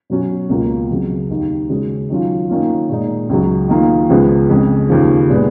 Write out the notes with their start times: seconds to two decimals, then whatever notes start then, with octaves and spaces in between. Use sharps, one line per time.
0.10 B2 F#3 C#4 F#4
0.50 C#2 B2 A#3 F4
0.90 F2 C#3 F#3
1.30 D#2 D#3 A#3
1.69 C#3 G#3 C#4 F#4
2.10 D#3 F#3 C#4 F4
2.49 D#3 A#3 C#4 F4
2.89 A#2 G#3 D#4
3.29 C#2 C#3 F#3
3.69 D#3 A#3 F4
4.10 C#2 C#3 F3 G#3 B3
4.50 F2 C#3 G#3
4.89 D#2 C#3 F3
5.29 A#2 G#3 B3